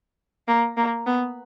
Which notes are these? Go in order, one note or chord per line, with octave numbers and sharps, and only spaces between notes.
A#3
A#3
B3